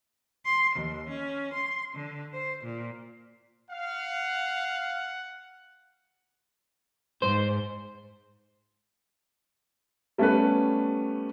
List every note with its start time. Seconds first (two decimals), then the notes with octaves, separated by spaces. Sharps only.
0.44 C6
0.75 D#2
1.09 C#4
1.52 C6
1.94 D3
2.32 C5
2.62 A#2
3.71 F5 F#5
7.22 G#2 C5
10.18 G3 A3 B3 C#4 G4 B4